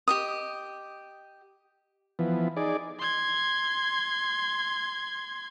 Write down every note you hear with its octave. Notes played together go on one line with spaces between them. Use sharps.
G4 D#5 D#6
E3 F3 B3
D#4 G#4 D5
C6 G#6